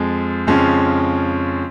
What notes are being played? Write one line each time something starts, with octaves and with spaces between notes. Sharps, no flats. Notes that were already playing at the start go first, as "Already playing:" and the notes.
Already playing: F2 F3 G#3
F2 C#3 F3 G#3 C#4